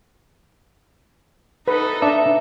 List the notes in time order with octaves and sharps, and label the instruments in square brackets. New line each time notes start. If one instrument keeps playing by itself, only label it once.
[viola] D#4 A4 [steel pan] B4
[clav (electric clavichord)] D4 [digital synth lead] E5